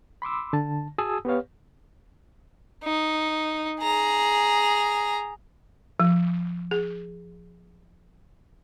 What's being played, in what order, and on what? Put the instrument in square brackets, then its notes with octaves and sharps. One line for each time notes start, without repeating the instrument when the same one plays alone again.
[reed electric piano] B5 C6 D6 E6
D3 A5
F#4 G#4 G#5 A5 D#6 E6
B3 G4 B4 C#5 F5
[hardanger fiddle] D#4
G#4 A#5
[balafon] F3
G#4